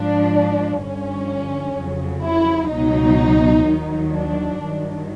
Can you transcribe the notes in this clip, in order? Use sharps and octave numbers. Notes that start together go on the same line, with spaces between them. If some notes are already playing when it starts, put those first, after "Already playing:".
Already playing: G#2 F3 D4
G2 D3 F3 C#4
F2 C#3 F#3
E4
C#2 B2 F#3 D#4
D#2 D#3 F#3
D4
G2 D#3 F#3